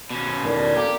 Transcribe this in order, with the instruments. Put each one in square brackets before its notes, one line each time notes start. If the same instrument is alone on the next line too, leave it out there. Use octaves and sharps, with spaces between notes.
[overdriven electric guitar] B2 C#4
[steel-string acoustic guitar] C5
E2 D3 D#3
[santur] D4
[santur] A#3 [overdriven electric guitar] G4 [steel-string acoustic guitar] A4